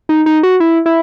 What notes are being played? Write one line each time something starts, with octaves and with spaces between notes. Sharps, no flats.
D#4
D#4
F#4
E4
E4